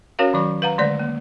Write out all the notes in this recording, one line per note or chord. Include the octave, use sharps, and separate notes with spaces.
C#4 F#4 A#4 C#5 F5
D#3 F#3 C#6
B4 F5 F#5 A#5
D3 G#3 A3 C5 D5
A#3